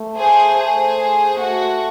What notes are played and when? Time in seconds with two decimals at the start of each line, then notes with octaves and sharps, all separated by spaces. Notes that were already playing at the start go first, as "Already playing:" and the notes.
Already playing: A3
0.17 G#4 C5
0.57 G#4 C5
1.38 A3 F#4